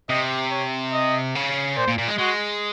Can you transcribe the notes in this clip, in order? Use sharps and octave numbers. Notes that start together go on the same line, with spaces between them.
C3 D#5
C#5
D#5
C#3
A#2 C5
A#2
A#2
G#3
G#3 F#4